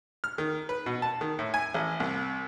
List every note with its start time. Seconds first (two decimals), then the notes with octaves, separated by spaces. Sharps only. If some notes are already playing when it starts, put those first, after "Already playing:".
0.24 F6
0.38 D#3
0.69 B4
0.86 B2
1.02 A5
1.21 D#3
1.39 A2
1.54 G#5
1.74 A1
2.00 C2